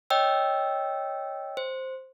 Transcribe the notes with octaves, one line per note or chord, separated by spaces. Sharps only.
C#5 D#5 G5 E6
C5